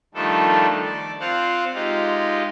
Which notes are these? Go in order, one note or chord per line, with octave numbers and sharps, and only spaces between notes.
D#3 F3 G3 A3 D4 A4
D5
C4 F4 C5 F5 F#5
G#3 D#4 F4 G4